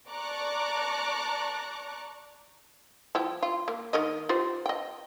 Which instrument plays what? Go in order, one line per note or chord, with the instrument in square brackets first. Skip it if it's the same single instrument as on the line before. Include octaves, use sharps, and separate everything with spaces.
[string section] D5 A5 A#5 C#6 D6 F#6
[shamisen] F3 E4 G5
F4
A#3
D#3 A#4 D#5
F4 G4 C5
D#5 G5